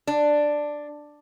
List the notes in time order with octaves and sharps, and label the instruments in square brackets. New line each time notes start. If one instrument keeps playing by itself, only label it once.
[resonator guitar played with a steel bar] D4